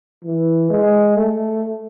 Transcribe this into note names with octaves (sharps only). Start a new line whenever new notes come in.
E3
G#3
A3